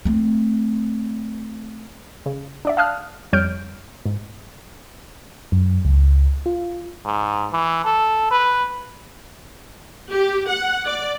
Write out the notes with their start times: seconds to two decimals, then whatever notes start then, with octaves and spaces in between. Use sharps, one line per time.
0.05 A3 C4
2.26 C#3
2.65 D4 D5 E5
2.77 F5 A5 D#6 F6 F#6
3.33 F2 G3 C#5 F6 G6 D7
4.06 G#2
5.52 F#2
5.85 C#2
6.46 F4
7.05 G#2
7.53 E3
7.85 A4
8.31 B4
10.10 G4
10.49 F#5
10.85 D5